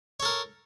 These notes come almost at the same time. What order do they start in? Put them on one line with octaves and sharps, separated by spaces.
C#5 A4 A#4